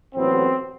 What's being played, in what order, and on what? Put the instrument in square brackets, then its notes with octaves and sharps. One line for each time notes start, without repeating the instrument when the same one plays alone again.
[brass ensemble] A1 A2 F#3 B3 C4